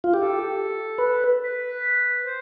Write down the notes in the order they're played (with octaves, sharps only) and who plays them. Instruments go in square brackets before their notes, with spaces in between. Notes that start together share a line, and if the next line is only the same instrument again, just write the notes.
[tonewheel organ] F4
[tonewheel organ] G4 [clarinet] A4
[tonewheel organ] B4
[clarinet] B4
C5